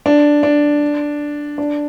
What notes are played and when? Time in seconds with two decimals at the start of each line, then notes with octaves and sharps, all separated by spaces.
0.06 D4
0.43 D4
1.58 D4